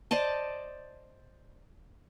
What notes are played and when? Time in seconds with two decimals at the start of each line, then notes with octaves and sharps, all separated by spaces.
0.11 C5 D5 D#5 A5